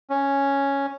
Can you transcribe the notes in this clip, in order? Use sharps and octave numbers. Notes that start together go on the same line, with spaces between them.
C#4